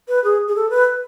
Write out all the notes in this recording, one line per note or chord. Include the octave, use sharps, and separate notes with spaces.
B4
G#4
G#4
A4
B4